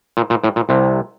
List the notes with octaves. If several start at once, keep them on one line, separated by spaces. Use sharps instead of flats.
A#2
A#2
A2
A#2
C2 C3